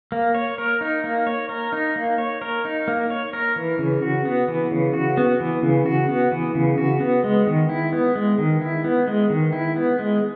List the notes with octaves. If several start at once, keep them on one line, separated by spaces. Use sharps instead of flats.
A#3
C#5
A#4
D#4
A#3
C#5
A#4
D#4
A#3
C#5
A#4
D#4
A#3
C#5
A#4
E3
C#3
F#4
B3
E3
C#3
F#4
B3
E3
C#3
F#4
B3
E3
C#3
F#4
B3
G#3
D#3
E4
B3
G#3
D#3
E4
B3
G#3
D#3
E4
B3
G#3